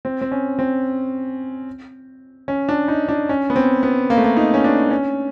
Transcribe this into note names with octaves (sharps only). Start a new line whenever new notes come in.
C4
C4
C#4
C4
C#4
D4
D#4
D4
C#4
B3
C4
B3
A#3
A3
A#3
D#4
C#4
D4
C#4